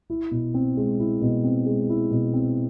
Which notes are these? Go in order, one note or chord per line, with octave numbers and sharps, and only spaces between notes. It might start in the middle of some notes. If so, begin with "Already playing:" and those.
E4
B2
C4
G#3
E4
B2
C4
G#3
E4
B2
C4